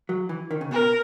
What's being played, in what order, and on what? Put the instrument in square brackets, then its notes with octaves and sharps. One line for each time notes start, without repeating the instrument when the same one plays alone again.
[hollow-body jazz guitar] F#3
E3
D#3
C#3
[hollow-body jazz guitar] B2 [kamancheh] A#4